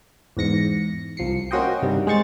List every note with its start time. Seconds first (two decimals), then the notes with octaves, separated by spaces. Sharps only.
0.37 E2 G#2 A#6 C#7
1.17 C2 F3 C7 C#7
1.51 A#3 C#4 F#4 C5 D#5 G5
1.82 G2 C3 D#3 G3
2.07 G#3 C5 C#6 A6